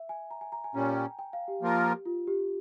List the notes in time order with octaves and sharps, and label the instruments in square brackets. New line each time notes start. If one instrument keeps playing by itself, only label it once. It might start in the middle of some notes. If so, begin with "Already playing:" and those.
Already playing: [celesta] E5
G#5
A#5
G#5
A#5
G#5
[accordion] A#2 G3 C#4 [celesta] A#5
[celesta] G#5
G5
G5
F5
G4
[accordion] F3 A#3 F4 A#4
[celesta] F4
G4